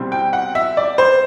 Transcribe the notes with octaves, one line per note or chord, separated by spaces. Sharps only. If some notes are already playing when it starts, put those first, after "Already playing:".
Already playing: C2 B2 G3 C4
G5
F#5
E5
D5
C5